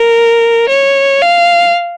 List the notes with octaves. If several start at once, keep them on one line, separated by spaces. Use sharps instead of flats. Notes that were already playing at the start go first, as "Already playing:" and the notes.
Already playing: A#4
C#5
F5